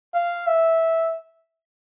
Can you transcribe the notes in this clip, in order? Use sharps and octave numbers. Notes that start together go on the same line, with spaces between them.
F5
E5